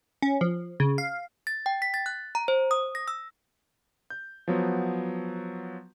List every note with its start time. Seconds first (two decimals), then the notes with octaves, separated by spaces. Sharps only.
0.22 C#4
0.41 F3
0.80 C#3
0.98 F5
1.47 A6
1.66 G5
1.82 B6
1.94 A6
2.06 F#6
2.35 A#5
2.48 C5
2.71 D#6
2.95 A#6
3.08 E6
4.10 G6
4.48 F3 F#3 B3